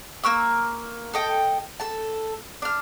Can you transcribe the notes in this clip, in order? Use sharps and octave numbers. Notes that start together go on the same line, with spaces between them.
A#3 A#4 C#6 E6
A4 D#5 G5
A4 A5
D4 F6